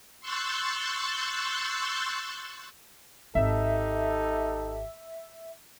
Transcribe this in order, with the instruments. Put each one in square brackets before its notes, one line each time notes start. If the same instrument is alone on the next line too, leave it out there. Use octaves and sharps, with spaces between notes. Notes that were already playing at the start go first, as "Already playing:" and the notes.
[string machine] C6 C#6 E6 F#6 G6 A6
[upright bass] G#1 [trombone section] D#4 G4 A4 [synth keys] E5